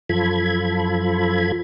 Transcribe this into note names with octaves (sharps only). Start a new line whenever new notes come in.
F#2 F3 F4 A4 B5 G#6